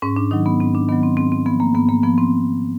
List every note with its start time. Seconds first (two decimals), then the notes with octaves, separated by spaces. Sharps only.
0.02 G#2 C#4
0.16 D4
0.31 D#3 F#3 D#4
0.46 B3
0.60 G#2 C4
0.75 D4
0.89 D#3 F#3 B3
1.03 C4
1.17 G#2 C4
1.32 C4
1.46 F3 B3
1.60 A#3
1.74 G#2 B3
1.89 A#3
2.03 F3 B3
2.18 C4